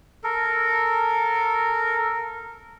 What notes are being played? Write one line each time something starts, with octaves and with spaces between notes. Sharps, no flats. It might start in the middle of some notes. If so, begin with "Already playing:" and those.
A4 A#4